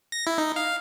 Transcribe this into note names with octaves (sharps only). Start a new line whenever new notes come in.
A#6
E4
D#4
F5